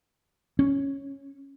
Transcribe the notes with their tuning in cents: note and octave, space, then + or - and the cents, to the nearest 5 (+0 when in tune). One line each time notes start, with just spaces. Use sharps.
C#4 -5